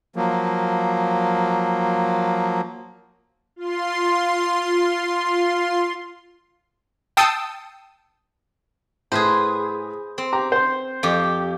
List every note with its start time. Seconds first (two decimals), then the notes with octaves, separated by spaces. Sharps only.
0.16 F3 F#3 A#3
3.56 F4 C6
7.17 G5 A5 D#6 E6 C7 C#7
9.12 A2 G#4 B4 C5
10.18 C4
10.32 G4 A#5
10.52 C5 C6
11.03 F2 G4